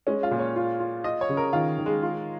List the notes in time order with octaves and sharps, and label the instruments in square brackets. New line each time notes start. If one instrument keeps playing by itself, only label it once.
[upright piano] G#3 [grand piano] C#4
[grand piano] F4
[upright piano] A#2
[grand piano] C#5
[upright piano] F4
F4
[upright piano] F4 [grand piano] D#5
[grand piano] C#5
[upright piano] C#3
[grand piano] A#4
[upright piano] D#3 [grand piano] F4
[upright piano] D#3
[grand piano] G#3
[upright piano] F4